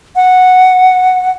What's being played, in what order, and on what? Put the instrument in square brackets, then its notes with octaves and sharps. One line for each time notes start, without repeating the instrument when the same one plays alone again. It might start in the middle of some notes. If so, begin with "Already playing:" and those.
[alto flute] F#5